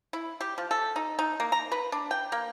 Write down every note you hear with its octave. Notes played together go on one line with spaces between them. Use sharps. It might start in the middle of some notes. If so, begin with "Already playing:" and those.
E4
G4
F3
A4
D#4
D#4
A#3
A#5
B4
D4
G5
A#3